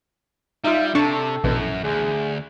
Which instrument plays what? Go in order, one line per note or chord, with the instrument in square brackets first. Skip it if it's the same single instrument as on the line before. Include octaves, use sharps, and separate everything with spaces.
[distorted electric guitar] G3 [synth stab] D#4 F4 [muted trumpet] E5
[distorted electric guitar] C3 [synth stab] D4 A5 C#6 [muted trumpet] A4
[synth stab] A#1 B2 E3 [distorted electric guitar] F#2
[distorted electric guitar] D2 [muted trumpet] G#4